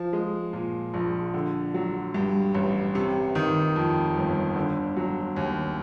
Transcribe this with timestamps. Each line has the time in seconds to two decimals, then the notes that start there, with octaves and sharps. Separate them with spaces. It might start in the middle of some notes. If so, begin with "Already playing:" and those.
Already playing: F3
0.13 G#3
0.53 A#2
0.94 A#1
1.34 D3
1.74 F#3
2.14 G2
2.55 A1
2.95 C3
3.35 D#3
3.76 F2
4.16 G1
4.56 D3
4.97 F#3
5.36 D#2